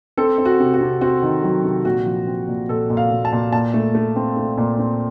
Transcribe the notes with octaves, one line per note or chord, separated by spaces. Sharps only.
C4 A4
C4
F#4
C3
F#4
C3
C4 F#4
D#3
F#3
C3
A#2 F#4
F3
C4
A#2
A#2 A4
A#2
F5
A#2
A5
A#2
A#2 A5
A3
A3
C4
A3
A#2
C4